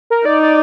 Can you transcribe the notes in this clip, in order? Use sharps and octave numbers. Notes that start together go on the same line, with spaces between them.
A#4
D#4 D5
D5